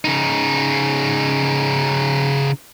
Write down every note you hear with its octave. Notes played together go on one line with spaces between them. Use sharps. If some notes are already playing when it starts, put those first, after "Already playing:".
C#3 D#4